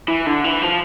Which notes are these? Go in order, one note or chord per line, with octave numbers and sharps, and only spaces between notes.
E3
D3
E3
F3